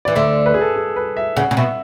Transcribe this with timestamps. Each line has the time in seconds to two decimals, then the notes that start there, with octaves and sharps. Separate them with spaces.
0.05 E3 D5
0.15 D2 D3 E5
0.46 B4
0.54 G#4
0.61 A4
0.76 G#4
0.96 B4
1.17 E5
1.37 C#3 F#5
1.51 C#3
1.57 B2 E5